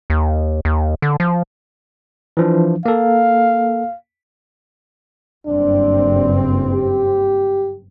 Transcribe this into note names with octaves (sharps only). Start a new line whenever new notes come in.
D#2
D#2
D3
F3
E3 F3 D4
A#3 A4 F5
F#1 G2 C4 D4
G4